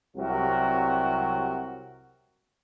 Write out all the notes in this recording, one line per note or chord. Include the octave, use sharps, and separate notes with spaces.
C2 C3 F#3 F#4 A#4